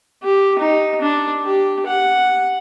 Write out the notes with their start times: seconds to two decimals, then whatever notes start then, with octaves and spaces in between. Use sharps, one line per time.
0.23 G4
0.59 D#4
1.02 D4
1.44 G4
1.87 F#5